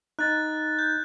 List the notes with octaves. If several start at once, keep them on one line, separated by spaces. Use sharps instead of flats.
D#4 F#6 A6
G6